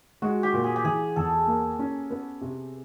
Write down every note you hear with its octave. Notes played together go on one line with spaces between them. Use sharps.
G#3 F#4
G4
A#2
G#4
G4
E3 G#4
E2 A4
A#3
C#4
B3
C3